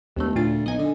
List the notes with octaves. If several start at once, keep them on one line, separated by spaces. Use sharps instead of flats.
E1 D#2 A3
D2 A#2 F4 A6
B1 D#5 G#5
D3